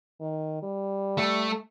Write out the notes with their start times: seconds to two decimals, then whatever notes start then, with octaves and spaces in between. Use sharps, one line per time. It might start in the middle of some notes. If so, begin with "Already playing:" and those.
0.21 D#3
0.63 G3
1.18 A3